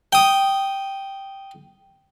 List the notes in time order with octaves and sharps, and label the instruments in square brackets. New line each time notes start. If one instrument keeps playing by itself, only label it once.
[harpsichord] G5 D#6